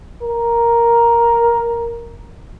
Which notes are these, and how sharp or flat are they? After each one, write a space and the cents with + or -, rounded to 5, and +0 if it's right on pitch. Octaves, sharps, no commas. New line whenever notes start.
A#4 +5